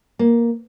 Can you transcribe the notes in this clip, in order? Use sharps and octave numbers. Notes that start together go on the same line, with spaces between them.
A#3